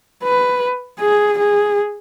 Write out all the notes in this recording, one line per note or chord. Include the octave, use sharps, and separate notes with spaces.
B4
G#4
G#4